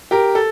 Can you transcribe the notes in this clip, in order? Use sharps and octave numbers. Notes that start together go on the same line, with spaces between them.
G4 A#4
A4